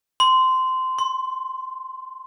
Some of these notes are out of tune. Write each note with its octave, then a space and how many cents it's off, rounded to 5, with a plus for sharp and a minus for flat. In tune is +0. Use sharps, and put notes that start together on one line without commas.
C6 -15
C6 +20